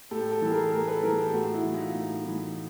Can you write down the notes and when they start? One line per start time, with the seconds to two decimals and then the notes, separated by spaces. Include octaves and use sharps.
0.11 A2 G4 A4
0.32 G4 A4
0.42 E3 A4
0.52 G#4 A#4
0.72 A2 G#4 A#4
0.87 A4 B4
1.03 E3 G#4 A#4
1.18 G4 A4
1.34 A2 F#4 G#4
1.54 E4 F#4
1.64 E3
1.74 D#4 F4
1.95 A2
2.26 E3